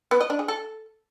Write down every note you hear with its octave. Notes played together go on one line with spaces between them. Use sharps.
B3
D#5
D4
G#4
A4